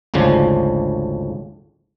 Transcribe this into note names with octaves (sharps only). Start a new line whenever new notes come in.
G#1 D2 C#3 F3 D4